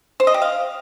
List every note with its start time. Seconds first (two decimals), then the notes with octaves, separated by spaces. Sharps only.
0.20 C5
0.27 D#5
0.34 G4
0.42 F5